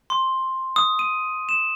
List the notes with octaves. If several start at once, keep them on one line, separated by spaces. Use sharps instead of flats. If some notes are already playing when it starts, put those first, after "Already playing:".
C6
D#6
D#7
E7